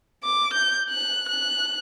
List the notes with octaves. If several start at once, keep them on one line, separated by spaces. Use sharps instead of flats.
D6
G6
F#6
F#6